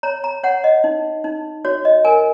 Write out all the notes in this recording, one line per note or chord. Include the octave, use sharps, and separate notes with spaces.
C#5 A#5
A#5
C#5 F#5
D#5
D#4
D#4
F#4 C#5
D#5
A#4 G#5